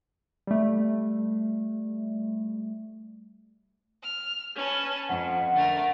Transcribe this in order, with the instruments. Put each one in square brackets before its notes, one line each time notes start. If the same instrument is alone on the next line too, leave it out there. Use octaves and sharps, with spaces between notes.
[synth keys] G3 A3
[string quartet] F6
C#4 B4 A5
[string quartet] F2 [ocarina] F#5
[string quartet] D3 A3 A#4